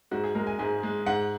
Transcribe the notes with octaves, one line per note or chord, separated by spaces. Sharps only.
G#2 F#4
G#4
G#3 A#4
G#5
G#2 G#5
G#3
G#2 F#5